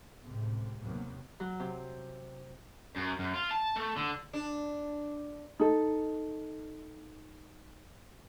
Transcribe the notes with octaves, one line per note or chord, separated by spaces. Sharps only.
C#2 A2 C3
D#2 C3 F#3 A#3 B3
F#3
C3
F#2
F#2
F4
A5
A3
D3
D4
D#4 A4